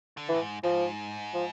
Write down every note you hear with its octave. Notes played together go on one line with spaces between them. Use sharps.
D3
A2 E3
G#2
G#2 F3
F3